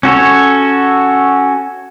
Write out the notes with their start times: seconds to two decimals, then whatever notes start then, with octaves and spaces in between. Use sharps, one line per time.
0.03 C#4 F#4 A4 C#5